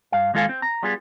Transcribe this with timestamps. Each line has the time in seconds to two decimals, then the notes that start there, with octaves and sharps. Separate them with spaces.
0.12 G2 F5
0.34 D#2 G#3 F4 A4 F5 G#5
0.49 C4
0.62 A#5
0.83 G3 B3 F4 G#4